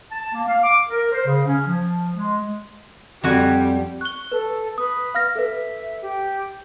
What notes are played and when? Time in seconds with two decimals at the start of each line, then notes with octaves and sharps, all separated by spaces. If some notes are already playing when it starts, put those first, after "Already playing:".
0.12 A5
0.34 A#3
0.48 F5
0.64 D6
0.90 A#4
1.12 C5
1.26 C#3
1.47 C#4
1.67 F3
2.15 G#3
3.24 F2 G3 F#4 G#5
4.01 C#6 F#6 G7
4.32 A4 B4
4.78 B4 D#6
5.15 F5 F6 A#6
5.36 A4 B4 E5
6.02 G4